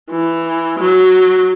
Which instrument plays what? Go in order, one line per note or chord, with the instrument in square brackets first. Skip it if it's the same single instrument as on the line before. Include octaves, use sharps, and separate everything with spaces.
[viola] E3
F#3